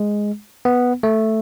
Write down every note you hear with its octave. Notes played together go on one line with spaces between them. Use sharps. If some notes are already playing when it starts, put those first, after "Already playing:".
Already playing: G#3
B3
A3